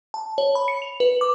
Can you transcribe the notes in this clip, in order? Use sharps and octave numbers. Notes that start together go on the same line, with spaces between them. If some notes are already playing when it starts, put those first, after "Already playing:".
A5
C#5
B5
C#7
F7
B4
D6